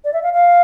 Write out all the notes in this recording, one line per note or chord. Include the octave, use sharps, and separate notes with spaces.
D5
E5
F5
F5